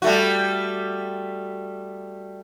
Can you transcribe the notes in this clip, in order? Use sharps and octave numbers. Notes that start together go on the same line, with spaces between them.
G3 A3 F#4